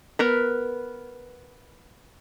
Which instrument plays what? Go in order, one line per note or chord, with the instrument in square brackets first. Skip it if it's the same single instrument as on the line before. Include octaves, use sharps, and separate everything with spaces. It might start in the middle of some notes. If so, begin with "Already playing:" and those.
[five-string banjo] B3 A#4 B4